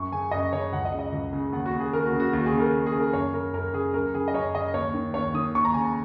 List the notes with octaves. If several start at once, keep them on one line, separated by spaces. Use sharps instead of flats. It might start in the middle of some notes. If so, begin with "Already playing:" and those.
Already playing: F#2 C#6
C#3 G#5
F#2 D#5
C#3 C#5
C#2 F#5
D#5
C#3
D#5
C#2
C#3
D#2 F#5
F#4
C#3
G#4
D#2 A#4
F#4
C#3
F#4
D#2
F#4
G#4
C#3
A#4
D#2
G#4
C#3
A#4
F#2 C#5
C#3 A#4
F#2 A#4
C#3 G#4
F#2 A#4
C#3 G#4
D#5
F#2 C#5
C#3 D#5
D#2 C#5
D#3
D#2 C#5
D#3 D#6
D#2 C#6
A#5
C#3 G#5
A#5